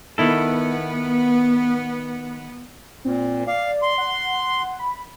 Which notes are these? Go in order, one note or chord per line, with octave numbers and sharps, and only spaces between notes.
D#3 B3 E4 A4
A#2 C4
D5 F5
C6
F#5
B5